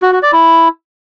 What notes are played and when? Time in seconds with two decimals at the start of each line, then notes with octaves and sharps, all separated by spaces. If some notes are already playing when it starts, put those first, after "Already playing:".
0.02 F#4
0.12 F#4
0.23 D5
0.33 E4